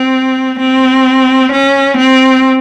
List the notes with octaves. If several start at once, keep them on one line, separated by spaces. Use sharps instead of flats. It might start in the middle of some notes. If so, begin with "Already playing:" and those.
Already playing: C4
C4
C#4
C4